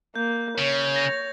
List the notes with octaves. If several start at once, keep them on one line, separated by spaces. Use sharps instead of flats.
A#3 G6
C#3 C#5
A#6 F7